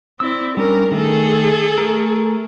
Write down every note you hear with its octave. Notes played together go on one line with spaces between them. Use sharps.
C4 E4 D5 E6
G3 C#4 D4 A#4
D#3 A3 G#4 A4
A3 A#4